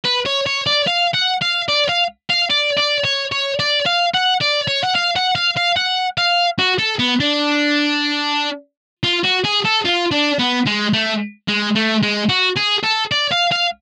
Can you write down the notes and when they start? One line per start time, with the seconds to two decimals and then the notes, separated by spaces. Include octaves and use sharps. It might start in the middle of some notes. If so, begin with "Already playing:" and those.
0.05 B4
0.26 C#5
0.47 C#5
0.67 D5
0.87 F5
1.14 F#5
1.42 F5
1.68 D5
1.89 F5
2.30 F5
2.51 D5
2.77 D5
3.04 C#5
3.32 C#5
3.59 D5
3.86 F5
4.14 F#5
4.41 D5
4.68 C#5
4.84 F#5
4.95 F5
5.16 F#5
5.35 F5
5.57 F5
5.76 F#5
6.18 F5
6.59 F#4
6.79 A4
6.99 B3
7.20 D4
9.03 F4
9.24 F#4
9.44 G#4
9.65 A4
9.85 F4
10.12 D4
10.39 B3
10.67 G#3
10.93 A3
11.48 G#3
11.76 A3
12.03 G#3
12.29 F#4
12.57 G#4
12.84 A4
13.12 D5
13.32 F5
13.52 F5